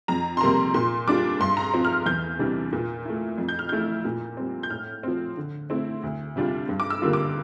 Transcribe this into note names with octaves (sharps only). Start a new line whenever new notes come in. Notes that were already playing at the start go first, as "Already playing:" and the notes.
F2 A#5
C6
C3 G3 A#3 A#5
A#2 C6
G3 D4 F4 D6
G2 C6
A#5
C6
F3 C4
F6
E2 G6
C3 E3 G3 D4
A#2
A3 E4
F2
G6
F6
E3 A3 E4 G6
A#2
G3 C4
G6
A2 F6
F3 C4
D3
A3 C4 E4
D2
C3 G3 D4 F4
G2
D6
E6
D3 G3 A#3 F4
D6